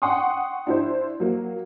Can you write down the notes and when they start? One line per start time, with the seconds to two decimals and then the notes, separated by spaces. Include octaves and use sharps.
0.02 F#5 G5 C6 C#6 D#6
0.67 D4 E4 C5
1.20 F#3 A#3